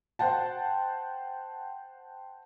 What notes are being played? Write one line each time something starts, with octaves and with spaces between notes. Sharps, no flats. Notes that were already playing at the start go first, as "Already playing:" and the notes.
C5 F#5 G5 A5